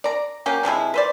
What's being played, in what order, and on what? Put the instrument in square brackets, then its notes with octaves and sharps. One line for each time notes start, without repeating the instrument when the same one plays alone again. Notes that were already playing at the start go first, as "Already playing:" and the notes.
[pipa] D5 A#5
F#3 A#3 C#4 G4
C3 F3 G#3 E4
B4 C5 D5